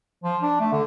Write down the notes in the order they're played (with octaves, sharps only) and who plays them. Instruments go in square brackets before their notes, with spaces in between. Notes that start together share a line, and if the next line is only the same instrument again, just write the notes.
[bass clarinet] F3
D4
A3
D3